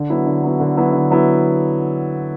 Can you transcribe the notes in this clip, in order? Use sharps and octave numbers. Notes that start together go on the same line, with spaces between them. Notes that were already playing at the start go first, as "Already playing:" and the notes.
Already playing: D3
F#3 B3 E4
D3
F#3 B3 E4
D3
F#3 B3 E4
D3
F#3 B3 E4